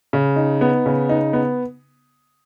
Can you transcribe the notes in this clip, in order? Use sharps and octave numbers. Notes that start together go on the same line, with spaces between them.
C#3
D#4
B3
C#3
D#4
B3